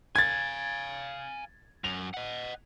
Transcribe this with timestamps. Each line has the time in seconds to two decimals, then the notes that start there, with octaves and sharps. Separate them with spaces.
0.16 F5 G#5 G#6 A6
1.84 F#2 F7
2.14 D#5 F#5